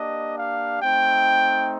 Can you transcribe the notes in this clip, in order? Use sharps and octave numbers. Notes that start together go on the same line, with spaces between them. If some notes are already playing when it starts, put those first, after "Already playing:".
Already playing: A#3 D4 G4 D#5
F5
A3 C4 D#4 G5